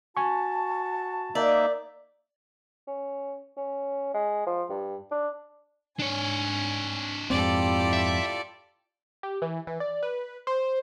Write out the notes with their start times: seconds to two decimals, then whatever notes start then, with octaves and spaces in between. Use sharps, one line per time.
0.17 F#4 G#5 A5 C#6
1.35 A#3 D#4 D5 E5
2.87 C#4
3.57 C#4
4.14 G#3
4.46 F3
4.70 G2
5.11 D4
5.99 G#2 D4 C#5 G#5
7.30 F2 G#2 C4 E4 F4 G4 A4 D5
7.93 E5
9.23 G4
9.42 E3
9.67 E3
9.80 D5
10.03 B4
10.47 C5